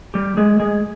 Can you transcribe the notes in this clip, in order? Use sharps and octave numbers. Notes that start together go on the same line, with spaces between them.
G3 G4
G#3 G#4
G#3 G#4